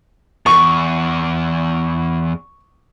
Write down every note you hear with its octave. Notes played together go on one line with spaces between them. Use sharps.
E2 C#6